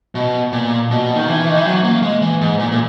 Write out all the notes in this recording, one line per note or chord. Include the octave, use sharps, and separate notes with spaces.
B2
A#2
B2
D#3
E3
D#3
E3
F#3
A#3
G#3
E3
G#2
A#2
A#2